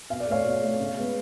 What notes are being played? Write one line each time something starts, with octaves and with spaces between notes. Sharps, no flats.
B2 F5
D5
A3 C#5 F5
B2
A3
C#3
G#3 B3